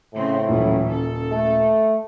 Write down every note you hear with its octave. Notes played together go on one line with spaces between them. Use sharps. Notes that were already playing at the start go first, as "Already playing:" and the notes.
A2 C#3 C4
D#1 C#3 E3 F#3
A4
A3